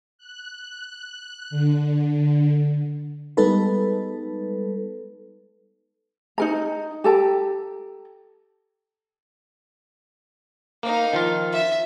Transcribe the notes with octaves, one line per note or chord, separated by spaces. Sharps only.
F#6
D3
G3 G#3 B3 D#4 A4 B4
D#4 A#4 A#5
G4 A4 A5 A#5
A#3 D#4 F5
D#3 F3 F4
E5